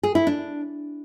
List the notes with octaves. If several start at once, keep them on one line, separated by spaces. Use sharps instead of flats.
G#4
E4
D4